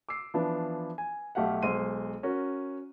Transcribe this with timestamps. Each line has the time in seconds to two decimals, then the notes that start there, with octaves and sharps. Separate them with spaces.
0.09 D6 E6 C7
0.34 E3 F3 B3 D4
0.98 G#5
1.35 B1 A3 G4 F5 F#5
1.63 B1 G#3 C5 C6 D#7
2.23 C#4 F#4 A#4